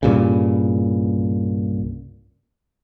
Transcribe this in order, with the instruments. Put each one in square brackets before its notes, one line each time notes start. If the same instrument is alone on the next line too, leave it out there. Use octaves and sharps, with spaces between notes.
[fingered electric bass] C2 G2 A#2 C#3